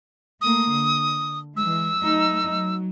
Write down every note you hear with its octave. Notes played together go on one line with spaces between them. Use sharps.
A3 A#3 D#6
D3
E3 G#3 E6
F#3 A3 D#4
F#3